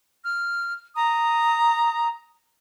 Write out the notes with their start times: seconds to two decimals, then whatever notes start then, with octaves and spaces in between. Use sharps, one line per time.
0.24 F6
0.95 A#5 D#6